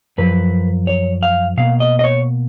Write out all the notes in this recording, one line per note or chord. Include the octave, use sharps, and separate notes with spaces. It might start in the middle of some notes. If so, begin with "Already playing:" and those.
F#2 F3 B4
C#5
F5
B2 A#3 F5
D#5
D#5
C#5